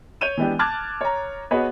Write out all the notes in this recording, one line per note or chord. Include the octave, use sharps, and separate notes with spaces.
C#5 G6 D#7 F7
E3 G#3 B3 D4 G4
A5 D6 F6 F#6 G#6 A6
C#5 A#5
B3 F#4 G#4 B4 C#5 D#5